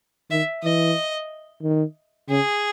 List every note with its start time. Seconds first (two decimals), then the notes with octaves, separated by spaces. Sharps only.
0.31 D#3 E5
0.63 E3 D#5
1.63 D#3
2.29 C#3 G#4